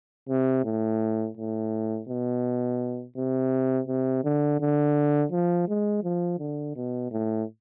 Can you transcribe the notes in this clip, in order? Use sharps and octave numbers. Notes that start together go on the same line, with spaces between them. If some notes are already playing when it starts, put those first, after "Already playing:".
C3
A2
A2
B2
C3
C3
D3
D3
F3
G#3
F3
D3
B2
A2